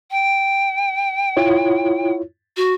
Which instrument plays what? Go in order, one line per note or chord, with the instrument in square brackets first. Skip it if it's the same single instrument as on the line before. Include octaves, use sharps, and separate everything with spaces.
[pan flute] G5
[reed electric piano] E4 F4 C#5
[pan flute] F#4